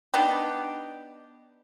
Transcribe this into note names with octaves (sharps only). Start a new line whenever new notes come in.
B3 D4 D#4 G4